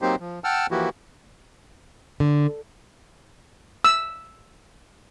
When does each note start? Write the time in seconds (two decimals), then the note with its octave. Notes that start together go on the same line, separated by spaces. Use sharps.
0.02 F#3 A#3 C4 D#4 G4 C5
0.20 F3
0.44 F#5 G5 A5 E6 F6
0.71 E3 F3 A#3 E4 F#4 G4
2.20 D3
3.84 E6